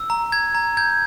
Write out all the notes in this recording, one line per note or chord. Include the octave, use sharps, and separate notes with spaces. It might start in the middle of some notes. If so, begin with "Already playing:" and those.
Already playing: E6
A#5
A#5 G#6
A#5
G6 G#6